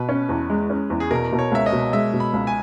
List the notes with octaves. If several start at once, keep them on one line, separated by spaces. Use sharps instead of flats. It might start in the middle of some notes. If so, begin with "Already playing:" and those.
Already playing: B2 B4
C#4
E2
G#3
C#4
E2
G#4
B2 A#4
B2
C#5
C#2 E5
D#5
B2
G#3 E5
B2
B5
C#2
G#5